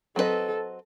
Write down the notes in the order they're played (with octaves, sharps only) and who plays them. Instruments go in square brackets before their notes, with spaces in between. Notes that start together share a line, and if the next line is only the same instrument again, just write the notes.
[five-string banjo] F#3 C4 E4 B4 D#5 [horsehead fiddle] A4